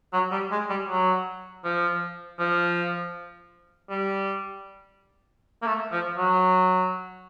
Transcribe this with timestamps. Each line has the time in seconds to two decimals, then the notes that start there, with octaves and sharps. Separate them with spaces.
0.13 F#3
0.32 G3
0.51 G#3
0.69 G3
0.89 F#3
1.64 F3
2.39 F3
3.90 G3
5.62 A#3
5.66 A3
5.92 F3
6.17 F#3